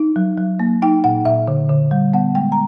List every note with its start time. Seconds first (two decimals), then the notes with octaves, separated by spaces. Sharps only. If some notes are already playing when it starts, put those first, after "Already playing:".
Already playing: D#4
0.16 F#3
0.37 F#3
0.60 A#3
0.82 D#4 G5
1.04 A#2 F#5
1.25 A#2 E5
1.48 D3
1.69 D3
1.91 G3
2.13 B3 F#5
2.35 G#3 G5
2.52 A#5